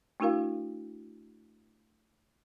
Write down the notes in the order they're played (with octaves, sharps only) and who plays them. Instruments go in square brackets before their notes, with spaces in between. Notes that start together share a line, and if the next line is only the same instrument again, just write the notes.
[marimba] A3 D4 E4 F#4 A#4 F5